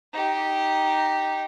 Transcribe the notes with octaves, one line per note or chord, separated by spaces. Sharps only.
D#4 G4